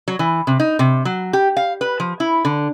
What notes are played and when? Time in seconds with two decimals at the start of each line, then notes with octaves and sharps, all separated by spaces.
0.08 F#3
0.19 E3
0.47 C3
0.60 D#4
0.79 C3
1.05 F#3
1.33 G4
1.57 F5
1.81 B4
2.00 F3
2.20 E4
2.45 D3